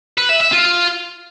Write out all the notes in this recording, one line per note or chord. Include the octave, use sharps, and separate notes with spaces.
B4
E5
E5
F4